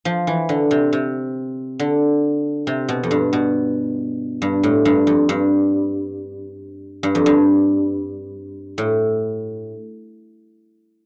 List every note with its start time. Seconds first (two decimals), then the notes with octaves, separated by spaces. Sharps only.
0.05 F3
0.27 E3
0.49 D3
0.71 C3
0.93 C3
1.79 D3
2.67 C3
2.89 B2
3.03 F2
3.11 G2
3.33 B2
4.42 G2
4.63 A2
4.85 G2
5.07 F2
5.29 G2
7.03 G2
7.15 F2
7.26 G2
8.78 A2